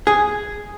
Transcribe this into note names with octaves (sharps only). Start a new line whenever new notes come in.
G#4